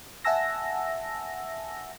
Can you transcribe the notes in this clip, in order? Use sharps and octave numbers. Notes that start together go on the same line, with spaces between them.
E5 F#5 G#5 A5 E6 A#6